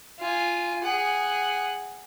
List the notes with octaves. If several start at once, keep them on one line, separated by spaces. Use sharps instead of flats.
F4 G#5
G#4 F#5